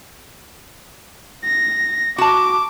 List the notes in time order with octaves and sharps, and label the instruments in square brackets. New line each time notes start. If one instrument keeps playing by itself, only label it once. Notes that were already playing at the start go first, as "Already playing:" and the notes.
[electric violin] A#6
[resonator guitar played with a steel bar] F#4 A5 [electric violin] D6